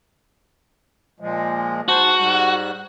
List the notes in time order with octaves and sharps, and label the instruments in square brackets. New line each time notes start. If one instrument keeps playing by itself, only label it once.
[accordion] A#2 F3 G#3
[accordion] G#2 C5 A5 [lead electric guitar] F#4
[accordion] G#2 G3 F#6